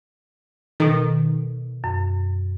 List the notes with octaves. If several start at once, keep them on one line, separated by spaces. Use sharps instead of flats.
B2 D#3 A4
F#2